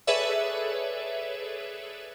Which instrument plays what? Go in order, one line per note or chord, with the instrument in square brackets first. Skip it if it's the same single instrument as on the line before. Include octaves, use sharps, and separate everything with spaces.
[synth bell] G#4 A4 B4 C#5 D5 E5